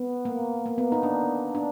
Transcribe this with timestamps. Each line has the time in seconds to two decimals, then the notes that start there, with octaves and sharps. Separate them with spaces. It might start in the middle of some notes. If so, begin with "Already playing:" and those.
Already playing: B3
0.25 A#3
0.66 A#3
0.78 B3
0.92 D#4
1.03 D4
1.55 D4